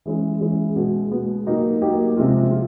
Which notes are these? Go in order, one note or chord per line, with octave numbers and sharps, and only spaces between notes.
E3 G#3 C#4 E4 G#4
E3 G#3 C#4 E4 G#4
B2 G#3 B3
B2 G#3 B3
F#3 A#3 D#4 G4
F#3 A#3 D#4 G4
C3 F3 G#3 C4 F4
F4